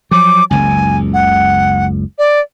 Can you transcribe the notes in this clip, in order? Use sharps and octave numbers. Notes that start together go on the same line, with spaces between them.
F3 F#3 D6
F#1 C#2 G#5
F#5
D5